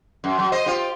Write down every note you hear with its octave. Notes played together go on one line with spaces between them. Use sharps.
F#2
F#3
C5 D#5
F4 G4